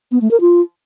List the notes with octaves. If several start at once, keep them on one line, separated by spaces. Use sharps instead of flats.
B3
A3
A#4
F4